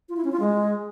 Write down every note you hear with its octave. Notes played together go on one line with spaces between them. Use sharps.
F4
E4
C#4
F4
G#3